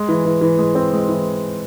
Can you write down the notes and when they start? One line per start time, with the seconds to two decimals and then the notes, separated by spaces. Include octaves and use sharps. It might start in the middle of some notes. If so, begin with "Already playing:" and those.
Already playing: G#3
0.09 E3
0.25 E3
0.41 E3
0.59 G#3
0.75 C4
0.93 G#3
1.09 E3